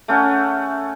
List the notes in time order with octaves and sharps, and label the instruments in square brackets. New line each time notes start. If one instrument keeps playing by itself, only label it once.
[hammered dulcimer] A3 C#4 F#5